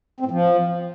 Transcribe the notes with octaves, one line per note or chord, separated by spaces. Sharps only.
C4
A2
F3